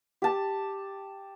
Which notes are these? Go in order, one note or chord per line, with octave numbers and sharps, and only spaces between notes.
G4 A5